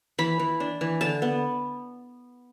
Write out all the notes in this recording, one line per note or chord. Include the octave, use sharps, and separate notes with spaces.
E3 B5
E3
D4
E3
D3 A5
B3